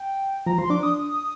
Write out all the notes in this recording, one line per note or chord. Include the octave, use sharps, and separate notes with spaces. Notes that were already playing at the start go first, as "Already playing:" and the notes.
Already playing: G5
F3 A#5
F3 C6
D4 D6
D#6